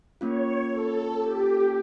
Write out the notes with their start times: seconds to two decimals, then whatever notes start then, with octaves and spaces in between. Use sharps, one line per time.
0.20 A#3 C#4 F4 C#5
0.69 A4
1.18 G4